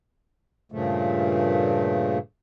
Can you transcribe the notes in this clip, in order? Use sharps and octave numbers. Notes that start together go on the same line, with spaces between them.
G2 A#2 C#3 F3 A3